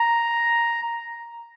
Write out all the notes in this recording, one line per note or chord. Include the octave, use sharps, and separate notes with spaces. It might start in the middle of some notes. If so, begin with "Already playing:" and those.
Already playing: A#5